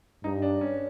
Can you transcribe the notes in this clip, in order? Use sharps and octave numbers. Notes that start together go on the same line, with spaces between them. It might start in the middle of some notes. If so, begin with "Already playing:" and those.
G2 D#4
D4
C#4